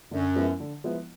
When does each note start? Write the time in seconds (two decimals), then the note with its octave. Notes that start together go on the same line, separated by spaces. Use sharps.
0.11 F#2 D3
0.35 F3 G#3 B3 E4
0.60 D3
0.84 F3 G#3 B3 E4